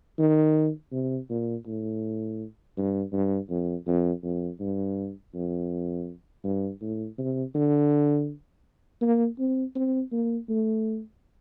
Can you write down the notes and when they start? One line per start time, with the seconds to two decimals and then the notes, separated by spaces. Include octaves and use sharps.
0.19 D#3
0.92 C3
1.30 A#2
1.67 A2
2.77 G2
3.13 G2
3.50 F2
3.87 F2
4.24 F2
4.60 G2
5.35 F2
6.44 G2
6.81 A2
7.18 C3
7.55 D3
9.02 A#3
9.39 C4
9.75 C4
10.12 A#3
10.49 A3